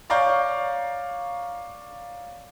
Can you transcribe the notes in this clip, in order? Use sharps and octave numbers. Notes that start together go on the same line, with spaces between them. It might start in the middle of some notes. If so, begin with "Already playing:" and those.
C#5 D5 F5 A#5 C#6 G6